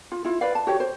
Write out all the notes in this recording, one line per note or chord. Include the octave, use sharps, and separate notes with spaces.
F4
E4 F4
B4 D5 F5
A5
F#4 G4 C#5
C5